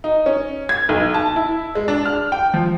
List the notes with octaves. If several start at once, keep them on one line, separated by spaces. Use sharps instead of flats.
D#4
C#4
G#6
B1
A5
E4
G#3
D4
F6
G5
F3